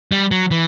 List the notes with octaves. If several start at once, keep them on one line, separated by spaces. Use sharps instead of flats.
G3
F#3
E3